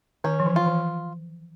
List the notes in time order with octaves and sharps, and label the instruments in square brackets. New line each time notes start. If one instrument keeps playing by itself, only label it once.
[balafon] D#3 [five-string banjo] C#4
[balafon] F3
E3
[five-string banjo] F4
[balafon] E3